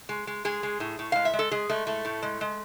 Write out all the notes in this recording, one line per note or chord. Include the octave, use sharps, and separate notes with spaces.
G#3
G#3
G#3 G#4
G#3
A2
A2
G#3 F5
E5
G#3
A4
G#3 G#4
G#3 A3
A2 A3
A2
G#3
G#3